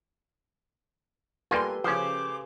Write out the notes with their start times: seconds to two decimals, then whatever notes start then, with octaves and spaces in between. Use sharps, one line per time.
1.51 G3 A#3 F4 G4 A4 B4 G#5 C6
1.84 C#3 F3 C#4 C5 D6